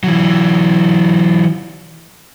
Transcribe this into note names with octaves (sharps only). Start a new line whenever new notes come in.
E3 F#3